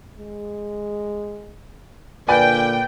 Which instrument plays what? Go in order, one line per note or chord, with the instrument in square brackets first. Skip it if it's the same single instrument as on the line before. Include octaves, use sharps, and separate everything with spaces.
[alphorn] G#3
[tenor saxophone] A#2 [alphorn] D3 [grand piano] B4 D5 G#5 [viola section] G5